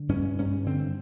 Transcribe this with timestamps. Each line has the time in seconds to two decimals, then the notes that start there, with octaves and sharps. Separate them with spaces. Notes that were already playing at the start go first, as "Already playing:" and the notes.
Already playing: D3
0.09 G2 C#4
0.38 G2 C#4
0.66 D3 C4